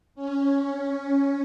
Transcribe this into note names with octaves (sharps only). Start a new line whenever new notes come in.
C#4